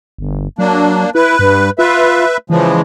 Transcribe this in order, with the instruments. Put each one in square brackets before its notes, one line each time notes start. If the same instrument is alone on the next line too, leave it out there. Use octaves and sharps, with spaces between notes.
[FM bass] G1
[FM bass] F#3 [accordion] A#3 D4
[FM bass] E4 [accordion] B4
[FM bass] G2
[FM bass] F4 [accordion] B4 E5
[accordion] C#3 F3 G#3 [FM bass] E3